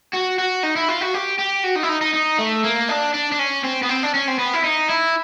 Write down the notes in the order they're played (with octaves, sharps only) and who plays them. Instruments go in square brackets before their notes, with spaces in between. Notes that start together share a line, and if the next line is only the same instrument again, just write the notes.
[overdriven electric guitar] F#4
F#4
D#4
E4
F4
F#4
G4
G4
F#4
D#4
E4
D#4
D#4
D#4
A3
A#3
D4
D4
D4
C#4
C4
B3
C4
D4
C#4
C4
B3
E4
D#4
E4